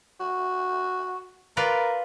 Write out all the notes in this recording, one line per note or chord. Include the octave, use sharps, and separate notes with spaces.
F#4
F4 A#4 B4 D5